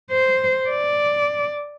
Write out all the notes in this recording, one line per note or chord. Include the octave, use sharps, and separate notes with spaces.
C5
D5